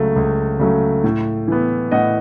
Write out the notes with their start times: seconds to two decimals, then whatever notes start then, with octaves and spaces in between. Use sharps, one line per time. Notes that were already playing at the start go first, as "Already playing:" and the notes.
Already playing: C#2 C#3 F#3 A3
0.16 C#2
0.59 C#3 F#3 A3
1.04 A2
1.48 E3 B3
1.91 A2 D#5 F#5